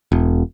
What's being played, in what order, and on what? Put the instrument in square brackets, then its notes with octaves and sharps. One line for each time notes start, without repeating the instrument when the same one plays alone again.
[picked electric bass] E1